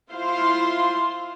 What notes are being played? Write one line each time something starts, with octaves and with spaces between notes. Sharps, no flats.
E4 F4 C5 F5 C6